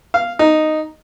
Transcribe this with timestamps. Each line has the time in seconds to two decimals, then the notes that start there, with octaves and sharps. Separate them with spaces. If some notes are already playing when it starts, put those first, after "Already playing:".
0.14 F5
0.39 D#4